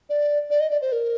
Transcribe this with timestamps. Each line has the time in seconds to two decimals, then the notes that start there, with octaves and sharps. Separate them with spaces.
0.09 D5
0.50 D5
0.60 D#5
0.70 D5
0.82 C5
0.92 A#4